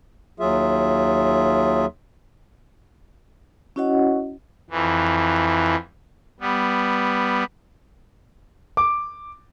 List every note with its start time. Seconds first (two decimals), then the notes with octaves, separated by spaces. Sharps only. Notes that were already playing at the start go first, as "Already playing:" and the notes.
0.40 D#2 F#3 F4 G#4 E5
3.76 C#4 E4 F#4 C#5 D#5 F#5
4.70 F2 E3
6.40 G3 B3
8.77 D6